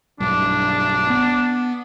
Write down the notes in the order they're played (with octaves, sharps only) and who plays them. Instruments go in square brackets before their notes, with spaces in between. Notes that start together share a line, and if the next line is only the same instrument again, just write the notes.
[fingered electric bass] B1 G2 [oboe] D4
[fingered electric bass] B3